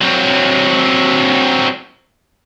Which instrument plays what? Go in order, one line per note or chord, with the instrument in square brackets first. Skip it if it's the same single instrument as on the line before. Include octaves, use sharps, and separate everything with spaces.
[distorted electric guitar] F#3 C4